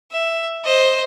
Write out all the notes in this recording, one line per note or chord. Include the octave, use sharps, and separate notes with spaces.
E5
C5 D#5